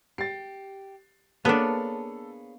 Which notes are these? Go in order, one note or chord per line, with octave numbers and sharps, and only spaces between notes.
G4 A6 C7
A#3 B3 D4 G#4 A4 B4 C#5